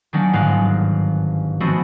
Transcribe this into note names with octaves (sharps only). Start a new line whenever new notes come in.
D#3 F#3 A#3 C#4 D4
G1 G#2 A#3 F5 F#6
F3 G#3 A3 B3 C4 F#4